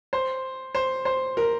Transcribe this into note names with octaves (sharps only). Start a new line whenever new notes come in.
C5
C5
C5
A#4